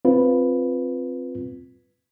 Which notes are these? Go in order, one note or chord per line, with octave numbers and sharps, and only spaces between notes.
C4 F4 B4